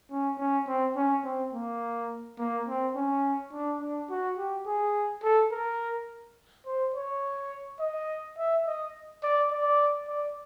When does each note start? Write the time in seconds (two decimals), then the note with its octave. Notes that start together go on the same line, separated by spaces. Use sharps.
0.11 C#4
0.38 C#4
0.67 C4
0.96 C#4
1.24 C4
1.53 A#3
2.38 A#3
2.67 C4
2.95 C#4
3.53 D4
3.80 D4
4.10 F#4
4.37 G4
4.66 G#4
5.23 A4
5.52 A#4
6.66 C5
6.94 C#5
7.80 D#5
8.37 E5
8.66 D#5
9.23 D5
9.51 D5
10.08 D5